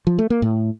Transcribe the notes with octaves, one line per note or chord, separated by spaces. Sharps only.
F3
A3
A#3
A2